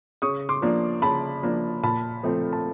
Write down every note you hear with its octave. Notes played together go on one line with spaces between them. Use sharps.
C#3 C#6 D#6
C6 D6
F3 A#3 D4
C#3 A5 B5
F3 A#3 D4
A#2 A5 B5
F3 A3 C4
A5